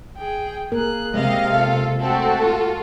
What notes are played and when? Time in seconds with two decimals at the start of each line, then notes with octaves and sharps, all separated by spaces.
0.17 G#4 G5
0.72 A#3 G#4 A#4 F#6
1.14 C3 G#3 D#5 F5
1.53 F4 A4
2.00 A3 C4 F#4 A4
2.43 F4